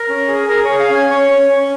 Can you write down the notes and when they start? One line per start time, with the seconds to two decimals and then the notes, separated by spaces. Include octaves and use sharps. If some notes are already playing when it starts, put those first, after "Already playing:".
Already playing: A#4
0.09 C#4
0.28 G#4
0.48 G#4 A#4
0.65 G#4 C#5
0.79 F5
0.89 C#4 G#5
1.10 C#4 C#5
1.30 C#4
1.50 C#4